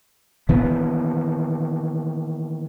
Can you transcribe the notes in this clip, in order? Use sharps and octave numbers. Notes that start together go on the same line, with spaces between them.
A#2 D#3 E3 B3